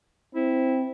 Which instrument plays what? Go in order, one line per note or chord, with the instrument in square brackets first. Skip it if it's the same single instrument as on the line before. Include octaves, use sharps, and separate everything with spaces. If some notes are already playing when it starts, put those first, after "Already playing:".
[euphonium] C4 [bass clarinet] E4